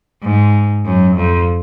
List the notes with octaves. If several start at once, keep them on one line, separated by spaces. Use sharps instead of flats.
G#2
F#2
F2